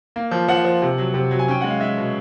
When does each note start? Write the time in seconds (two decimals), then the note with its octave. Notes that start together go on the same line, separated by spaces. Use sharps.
0.16 A#3
0.31 F3
0.48 F3 F#5
0.64 F3
0.82 C3
0.98 F#3
1.14 C3
1.31 F#3
1.39 G#5
1.48 C#4 G5
1.61 G#3 F#5
1.70 F5
1.80 G#3 E5
1.97 B2